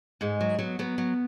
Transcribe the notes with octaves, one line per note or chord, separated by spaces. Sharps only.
G#2 G#3
F#3
F#3 B3
F#3 B3
F#3